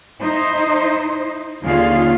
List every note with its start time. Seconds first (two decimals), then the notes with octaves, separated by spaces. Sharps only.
0.20 D#4 E4 C5 D#5
1.62 D#2 D3 C#4 F4 G#4 F5